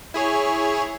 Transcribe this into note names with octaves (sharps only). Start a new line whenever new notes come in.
E4 G#4 C#5